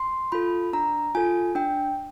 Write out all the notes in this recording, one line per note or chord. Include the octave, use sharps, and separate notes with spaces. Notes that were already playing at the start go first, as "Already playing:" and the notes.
Already playing: C6
F4 A4 B5
D4 A#5
F4 A4 G#5
D4 G5